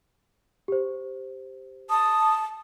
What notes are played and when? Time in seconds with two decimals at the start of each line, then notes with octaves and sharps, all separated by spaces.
0.68 G4 C5
1.90 A5 D#6